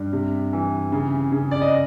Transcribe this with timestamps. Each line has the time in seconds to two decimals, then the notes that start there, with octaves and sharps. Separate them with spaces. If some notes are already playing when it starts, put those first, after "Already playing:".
Already playing: G2
0.13 C3
0.53 E3
0.92 C#3
1.32 C#3
1.51 D5
1.61 D#5